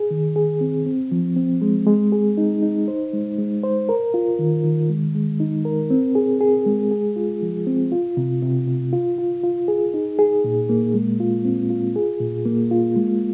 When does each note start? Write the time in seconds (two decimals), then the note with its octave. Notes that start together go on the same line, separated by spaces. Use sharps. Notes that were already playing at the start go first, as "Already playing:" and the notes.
Already playing: G#4
0.11 D#3
0.36 G#4
0.61 C4
0.86 C4
1.11 F3
1.36 C4
1.62 G#3
1.87 G#3
2.12 G#4
2.37 D#4
2.62 D#4
2.88 C5
3.13 G#3
3.38 G#3
3.63 C5
3.89 A#4
4.14 F4
4.39 D#3
4.64 D#3
4.90 G#3
5.15 G#3
5.40 D#4
5.65 A#4
5.90 C4
6.15 G#4
6.41 G#4
6.66 G#3
6.91 G#4
7.16 F4
7.42 F3
7.67 C4
7.92 F4
8.17 C3
8.42 C3
8.67 C3
8.93 F4
9.18 F4
9.44 F4
9.68 G#4
9.94 D#4
10.19 G#4
10.44 A#2
10.69 A#3
10.94 G#3
11.20 F4
11.45 C4
11.70 F4
11.96 G#4
12.20 A#2
12.46 A#3
12.71 F4
12.96 G#3